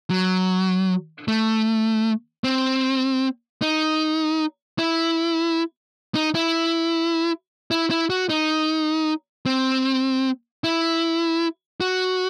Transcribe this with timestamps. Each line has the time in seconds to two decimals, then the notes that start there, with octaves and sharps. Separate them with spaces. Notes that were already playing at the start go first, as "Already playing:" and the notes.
0.10 F#3
1.28 A3
2.44 C4
3.62 D#4
4.79 E4
6.15 D#4
6.35 E4
7.71 E4
7.90 E4
8.10 F#4
8.29 D#4
9.46 C4
10.64 E4
11.81 F#4